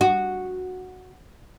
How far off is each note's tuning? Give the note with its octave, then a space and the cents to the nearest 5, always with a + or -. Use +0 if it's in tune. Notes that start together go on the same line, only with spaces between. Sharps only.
F#4 -5